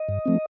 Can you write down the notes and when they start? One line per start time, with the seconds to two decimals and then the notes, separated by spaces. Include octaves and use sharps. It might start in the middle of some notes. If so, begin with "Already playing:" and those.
Already playing: D#5
0.09 G2
0.26 F3 A3 C4